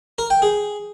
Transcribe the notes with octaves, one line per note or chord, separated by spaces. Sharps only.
A#4
G5
G#4